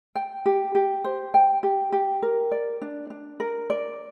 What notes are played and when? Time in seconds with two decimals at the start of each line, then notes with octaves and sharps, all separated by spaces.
0.15 G5
0.46 G4
0.75 G4
1.04 C5
1.34 G5
1.63 G4
1.92 G4
2.22 A#4
2.52 D5
2.82 D4
3.10 D4
3.40 A#4
3.70 D5